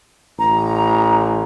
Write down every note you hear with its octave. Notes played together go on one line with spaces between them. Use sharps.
A1 A#5